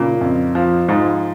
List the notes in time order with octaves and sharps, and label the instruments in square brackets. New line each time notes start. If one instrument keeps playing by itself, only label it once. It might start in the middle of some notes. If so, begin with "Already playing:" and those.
Already playing: [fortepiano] A#2 [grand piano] C#3
[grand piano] F2
F3
[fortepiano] G#2 [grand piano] F3